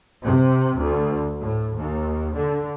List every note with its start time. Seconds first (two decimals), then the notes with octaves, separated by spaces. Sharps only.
0.24 C3
0.78 D2
1.38 A2
1.75 D#2
2.34 D3